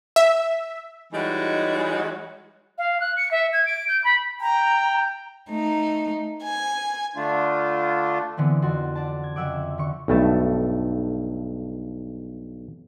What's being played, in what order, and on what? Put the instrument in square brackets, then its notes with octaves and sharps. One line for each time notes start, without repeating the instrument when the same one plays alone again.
[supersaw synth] E5
[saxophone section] E3 G3 G#3 D#4 F#4 C#5
[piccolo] F5
F#6
C#7
E5
G#6
D7
G6
B5
[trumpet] G5 [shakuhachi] A#5
[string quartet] A3 D#4
G#5
[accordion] D3 A3 D4 F4
[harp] D3 E3 B3 C4
F2 F#4 A5 C6
D4 A5
G#6
F2 C#3 E5 F#5 D6
D3 C#6
[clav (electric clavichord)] B1 G2 A3 A5